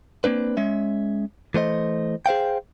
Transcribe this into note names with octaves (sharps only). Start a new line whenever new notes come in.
A#3 C4 D4 B4
G#3 C#4 E5
E3 A3 C5 D#5
G#4 C5 F5 G5